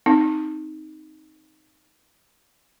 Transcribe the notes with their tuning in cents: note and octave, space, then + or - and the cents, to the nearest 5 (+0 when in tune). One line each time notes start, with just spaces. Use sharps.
C4 +0 D#4 +0